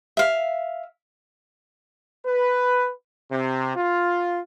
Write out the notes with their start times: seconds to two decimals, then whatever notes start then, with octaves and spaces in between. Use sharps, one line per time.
0.17 E5 F5
2.26 B4
3.31 C3
3.75 F4